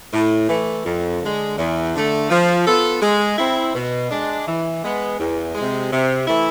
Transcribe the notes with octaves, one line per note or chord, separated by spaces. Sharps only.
A2
E3 A3
F2
D3 G#3
E2
D3 A3
F3
B3 F4 A4
G#3
C4 E4
B2
G#3 D4
E3
G#3 B3
E2
C3 G#3
C3
E3 A3 E4